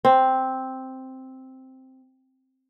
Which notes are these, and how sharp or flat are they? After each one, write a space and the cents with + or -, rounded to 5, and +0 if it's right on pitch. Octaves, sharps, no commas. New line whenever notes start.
C4 +0